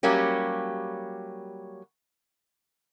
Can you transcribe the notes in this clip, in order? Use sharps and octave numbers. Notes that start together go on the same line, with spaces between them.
F#3 G3 A#3 C#4 G4